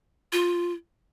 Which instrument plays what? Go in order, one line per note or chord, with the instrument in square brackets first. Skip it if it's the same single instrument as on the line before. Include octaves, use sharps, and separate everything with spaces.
[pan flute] F4